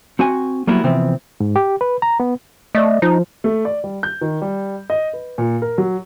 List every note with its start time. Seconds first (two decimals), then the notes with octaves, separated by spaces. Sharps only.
0.19 C4 F#4 F#5 G#5
0.67 F#3 G3 A#3 B3 E4
0.84 C3 E3 F3 B3 C4
1.40 G#2
1.56 G4
1.81 B4
2.02 A#5
2.20 B3
2.75 A3 D5 D#5
3.02 F3 D#4
3.44 A3
3.65 D5
3.84 G3
4.03 G6
4.21 D#3
4.42 G3
4.90 D#5
5.13 B4
5.38 A#2
5.62 A#4
5.78 F#3